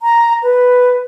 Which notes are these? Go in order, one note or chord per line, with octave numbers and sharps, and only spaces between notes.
A#5
B4